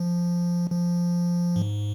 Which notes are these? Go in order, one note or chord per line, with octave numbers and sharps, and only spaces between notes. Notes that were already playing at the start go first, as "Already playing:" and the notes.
Already playing: F3
F3
G#2